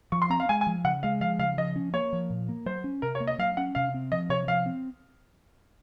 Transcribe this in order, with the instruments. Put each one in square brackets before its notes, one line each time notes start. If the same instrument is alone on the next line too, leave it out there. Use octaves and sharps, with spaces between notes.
[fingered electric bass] F3 [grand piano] C#6
[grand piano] C6
[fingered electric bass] C4 [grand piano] A#5
[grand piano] F5
[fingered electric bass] G#3 [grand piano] G#5
[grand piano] G#5
[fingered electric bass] F3
[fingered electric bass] C#3 [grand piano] F#5
[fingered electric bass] G#3 [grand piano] F5
[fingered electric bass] F3 [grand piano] F5
[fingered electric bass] C#3 [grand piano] F5
[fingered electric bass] F3 [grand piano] D#5
[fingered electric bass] C#4
[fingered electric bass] A#3 [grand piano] C#5
[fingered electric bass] F3
A#2
A#3
[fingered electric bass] F#3 [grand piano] C5
[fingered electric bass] C#4
[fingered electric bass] C3 [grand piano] A#4
[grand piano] C#5
[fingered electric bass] A#3
[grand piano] D#5
[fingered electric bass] F#3 [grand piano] F5
[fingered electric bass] C#4 [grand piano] F#5
[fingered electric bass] C3 [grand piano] F5
[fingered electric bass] C4
[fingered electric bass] F3 [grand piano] D#5
[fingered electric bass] C3 [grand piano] C#5
[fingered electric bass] F3 [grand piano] F5
[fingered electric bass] C4